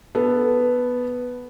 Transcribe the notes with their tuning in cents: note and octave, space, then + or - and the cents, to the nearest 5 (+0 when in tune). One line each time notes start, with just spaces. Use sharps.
B3 +0 A4 +0